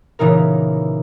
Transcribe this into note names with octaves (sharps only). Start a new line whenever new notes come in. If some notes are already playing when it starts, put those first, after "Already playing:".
A#2 C#3 E3 D#4 A#4